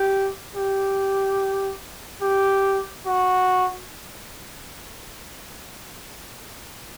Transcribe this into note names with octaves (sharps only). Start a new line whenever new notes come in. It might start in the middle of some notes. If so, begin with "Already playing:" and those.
Already playing: G4
G4
G4
F#4